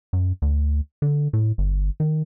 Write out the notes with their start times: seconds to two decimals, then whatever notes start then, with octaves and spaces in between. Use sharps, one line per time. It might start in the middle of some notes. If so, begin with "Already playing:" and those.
0.13 F#2
0.42 D2
1.02 D3
1.33 A2
1.58 G1
2.00 D#3